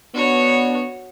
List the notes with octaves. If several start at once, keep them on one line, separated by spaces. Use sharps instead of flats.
B3 D4 F#4 C#5